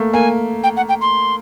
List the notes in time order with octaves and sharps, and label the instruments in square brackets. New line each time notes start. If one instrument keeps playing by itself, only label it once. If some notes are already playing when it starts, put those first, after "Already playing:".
Already playing: [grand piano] A3 A#3
[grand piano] A#3 [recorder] G#5
[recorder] G5
F#5
G5
C6